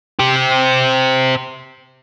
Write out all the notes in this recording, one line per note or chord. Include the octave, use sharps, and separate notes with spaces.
G4 C5